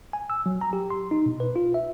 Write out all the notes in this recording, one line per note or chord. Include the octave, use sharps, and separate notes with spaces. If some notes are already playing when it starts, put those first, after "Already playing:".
G#5
E6
F#3
A#5
G4
C6
D#4
B2
B4
F4
E5